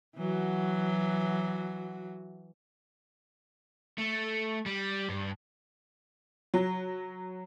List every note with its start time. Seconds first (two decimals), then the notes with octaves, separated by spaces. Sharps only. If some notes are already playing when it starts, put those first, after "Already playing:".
0.16 E3 F#3 F#4
3.98 A3
4.66 G3
5.09 G2
6.54 F#3